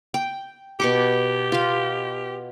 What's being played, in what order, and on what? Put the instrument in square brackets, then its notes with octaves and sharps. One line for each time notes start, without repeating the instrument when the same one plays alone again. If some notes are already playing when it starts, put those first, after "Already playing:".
[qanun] G5
[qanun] B2 C#6 D6 [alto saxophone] G4
[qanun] F4 F5